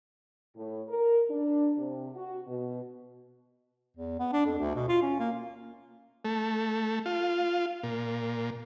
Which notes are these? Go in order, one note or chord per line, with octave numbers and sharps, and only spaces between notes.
A2
A#4
D4
C3
F#4
B2
E2
B3
D4
F2
D2
B2
F4
C#4
A#3
A3
F4
A#2